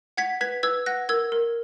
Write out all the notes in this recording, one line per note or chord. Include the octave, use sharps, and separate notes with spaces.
F#5 G#6 B6
B4 G#6 B6
B4 E6 G#6
F#5 F#6 A#6
A#4 E6 G#6
A#4